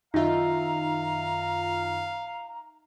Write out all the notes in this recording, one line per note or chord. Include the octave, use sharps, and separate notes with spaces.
F#2 D#3 D#4 F4 E5 F5 A#5